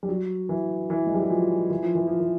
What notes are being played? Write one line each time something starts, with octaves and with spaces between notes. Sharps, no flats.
G3
F#3
E3
E3
G#3
G3
F#3
F3
E3
F3
E3
F3
E3